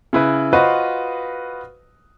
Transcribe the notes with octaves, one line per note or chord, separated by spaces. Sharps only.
C#3 E4 B4
F4 F#4 B4 C5 D#5